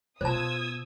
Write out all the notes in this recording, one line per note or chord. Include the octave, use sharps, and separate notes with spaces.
B2 F4 C5 A5 D#6 E6 G#6